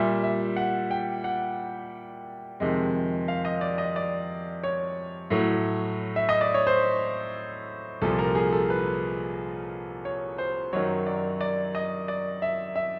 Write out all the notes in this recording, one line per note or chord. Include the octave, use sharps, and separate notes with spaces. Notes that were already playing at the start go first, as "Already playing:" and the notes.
Already playing: A#2 G3 E5
E5
F#5
G5
F#5
F2 C3 D#3 G#3
F5
D#5
D5
D#5
D5
C#5
A2 F#3 A3
E5
D#5
D5
C#5
C5
C2 A#2 F3 A4
A#4
G#4
A4
B4
C#5
C5
F#2 D#3 F#3 C#5
D5
D5
D#5
D5
E5
E5